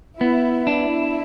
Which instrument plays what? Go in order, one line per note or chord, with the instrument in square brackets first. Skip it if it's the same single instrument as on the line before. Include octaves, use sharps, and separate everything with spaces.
[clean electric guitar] B3 [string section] E4
[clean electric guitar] D4 [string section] E4